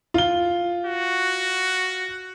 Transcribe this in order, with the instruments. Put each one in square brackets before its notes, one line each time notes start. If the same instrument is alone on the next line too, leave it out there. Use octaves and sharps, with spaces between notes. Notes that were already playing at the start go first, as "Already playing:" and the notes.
[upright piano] F4 G7
[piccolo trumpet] F#4